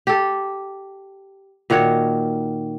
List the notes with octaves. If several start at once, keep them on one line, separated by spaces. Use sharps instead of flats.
G4 A4
A#2 D#3 F#4 C#5